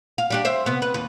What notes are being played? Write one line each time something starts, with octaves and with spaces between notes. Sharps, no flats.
F5
G3 D4 G4
C5 E5
C3 B3
B4
D#2 B4